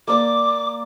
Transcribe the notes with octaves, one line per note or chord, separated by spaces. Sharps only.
A#3 D5 D6